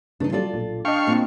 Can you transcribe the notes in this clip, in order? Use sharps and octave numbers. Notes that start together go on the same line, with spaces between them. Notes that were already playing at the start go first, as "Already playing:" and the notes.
G2 C#3 E3 D4 D#4
F#3 G3 F4 A4 D5
B1 A#2
D4 D#5 F5 G5 C#6
A#2 C4